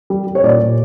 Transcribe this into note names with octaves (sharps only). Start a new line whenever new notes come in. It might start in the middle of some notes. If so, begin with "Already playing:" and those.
G3
G3
C#5
A#2 D5
A#2